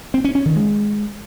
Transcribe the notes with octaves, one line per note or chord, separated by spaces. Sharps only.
C4
C#4
C#4
D#3
G#3